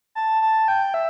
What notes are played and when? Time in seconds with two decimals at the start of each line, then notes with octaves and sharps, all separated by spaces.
0.15 A5
0.42 A5
0.68 G5
0.94 E5